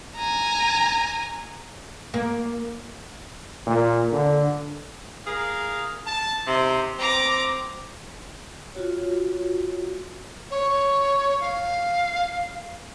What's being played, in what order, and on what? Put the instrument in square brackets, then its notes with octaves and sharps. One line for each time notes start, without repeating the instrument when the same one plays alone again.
[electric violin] G#5 A#5
[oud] A#3
[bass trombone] A#2
D3
[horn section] G#4 A#4 F5
A5
C3 D#4 C5
[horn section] C4 [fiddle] A#5 D6
[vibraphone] F4 F#4 C#5
[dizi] C#5
F5